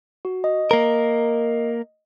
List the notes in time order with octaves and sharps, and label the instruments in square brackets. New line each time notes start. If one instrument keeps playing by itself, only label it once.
[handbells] F#4
D#5
[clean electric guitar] A#3 A#4